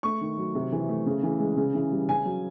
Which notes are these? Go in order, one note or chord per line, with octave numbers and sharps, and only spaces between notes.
A3 C#6
D#3
F#3
C3
E3
A3
C#3
E3
G#3
C#3
E3
G3
C#3 G#5
F#3